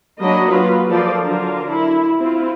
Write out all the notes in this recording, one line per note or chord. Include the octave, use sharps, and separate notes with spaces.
F#3 A#3 D4 D#5 B5
F4 B4
F3 F4 A4 A#4 C5 D5
D3 F#3 D4 F4 A#4
E4
C4 E4 F4